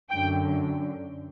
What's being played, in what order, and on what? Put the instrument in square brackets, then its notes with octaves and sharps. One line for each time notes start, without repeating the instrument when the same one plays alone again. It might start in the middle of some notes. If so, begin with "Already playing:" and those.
[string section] F#2 D3 G5